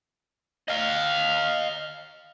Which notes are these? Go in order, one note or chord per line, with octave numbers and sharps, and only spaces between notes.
D#5 F5